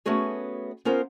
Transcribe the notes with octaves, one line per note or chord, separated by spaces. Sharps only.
A3 B3 C#4 F#4 G#4
B3 C#4 F4 A#4 C5